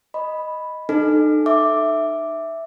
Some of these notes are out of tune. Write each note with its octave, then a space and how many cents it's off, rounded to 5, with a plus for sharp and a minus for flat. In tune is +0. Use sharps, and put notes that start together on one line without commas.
D#5 +0 B5 +0
D#4 -35 A4 -10
E5 +0 D6 +0